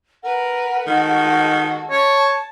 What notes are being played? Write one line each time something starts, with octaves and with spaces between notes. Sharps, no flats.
A#4 B4 F#5
D#3 G#3 F#4 A4
C#5 A5